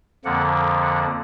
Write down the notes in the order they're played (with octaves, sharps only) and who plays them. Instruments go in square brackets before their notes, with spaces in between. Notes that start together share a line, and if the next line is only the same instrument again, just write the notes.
[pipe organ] F2 D3 F3 A#3 F#5
F#5